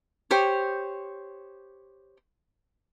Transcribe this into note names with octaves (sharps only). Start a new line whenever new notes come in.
G4 C5 C#5